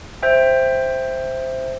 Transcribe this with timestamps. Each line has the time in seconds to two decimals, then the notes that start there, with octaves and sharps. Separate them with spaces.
0.23 C5 E5 G5